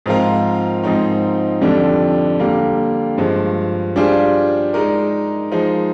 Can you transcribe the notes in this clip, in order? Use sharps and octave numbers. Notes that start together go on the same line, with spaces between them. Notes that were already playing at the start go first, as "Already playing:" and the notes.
G#2 F3 C4 F4 A#4
G#2 F3 C4 D#4
F2 D3 G3 D4
D3 G3 A#3
G2 F3 G#3
G3 D4 F4 G#4 C5
G#3 D#4 A#4 D5
F3 G#3 D#4